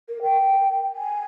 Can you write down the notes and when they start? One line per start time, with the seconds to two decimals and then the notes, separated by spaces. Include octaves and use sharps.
0.09 A#4
0.22 G5
0.96 G#5